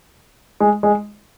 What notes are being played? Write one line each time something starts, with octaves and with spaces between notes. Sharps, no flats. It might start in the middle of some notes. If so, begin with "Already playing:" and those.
G#3
G#3